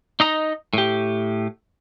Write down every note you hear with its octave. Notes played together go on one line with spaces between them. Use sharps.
D#4 D#5 A#5
A2 G4